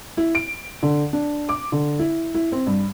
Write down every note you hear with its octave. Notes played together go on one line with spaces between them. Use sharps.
E4
D7
D3
D4
D6
D3
E4
E4
C4
G2